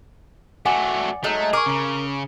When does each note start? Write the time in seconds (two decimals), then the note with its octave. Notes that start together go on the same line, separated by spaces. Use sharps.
0.66 F#3 A3 D5 F#5 G#5
1.24 F#3 G#3 A3 D#4
1.53 G#4 A#4 C#6 D6
1.66 C#3